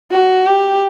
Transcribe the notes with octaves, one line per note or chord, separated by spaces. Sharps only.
F#4
G4